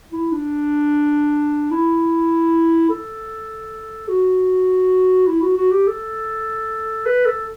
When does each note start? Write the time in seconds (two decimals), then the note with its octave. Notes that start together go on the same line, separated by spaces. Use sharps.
0.12 E4
0.32 D4
1.71 E4
2.90 A4
4.09 F#4
5.27 E4
5.42 F#4
5.57 F#4
5.72 G4
5.87 A4
7.06 B4
7.26 A4